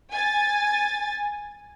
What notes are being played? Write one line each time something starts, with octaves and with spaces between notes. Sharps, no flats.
G#5 A6